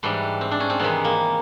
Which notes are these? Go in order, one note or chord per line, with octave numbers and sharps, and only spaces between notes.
G#2 E3 G3 D4
C4
D4
C#4
C4
E2 C3 D#3 G#3 B3
A#3